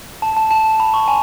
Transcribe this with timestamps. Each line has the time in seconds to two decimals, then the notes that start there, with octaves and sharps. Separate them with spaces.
0.22 A5
0.37 A5
0.51 A5
0.80 B5
0.94 C#6
1.08 G#5